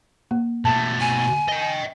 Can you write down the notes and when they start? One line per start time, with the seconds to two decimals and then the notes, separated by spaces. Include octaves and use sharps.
0.31 A#3
0.65 B2 A3 A5
1.00 G#5
1.48 D#5 G5